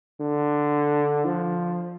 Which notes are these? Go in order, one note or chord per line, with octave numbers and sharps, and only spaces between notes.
D3
F3